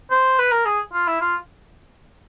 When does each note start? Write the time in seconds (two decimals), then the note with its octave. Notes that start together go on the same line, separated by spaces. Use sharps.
0.11 C5
0.39 B4
0.52 A#4
0.65 G#4
0.93 F4
1.08 E4
1.21 F4